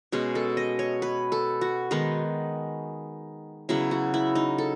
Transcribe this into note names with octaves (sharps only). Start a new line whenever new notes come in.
B2 G#3 C#4 G#4
A4
D#5
C#5
B4
A4
F#4
D#3 G#3 B3 D#4
C#3 F#3 B3 E4
F#4
E4
D#4
A4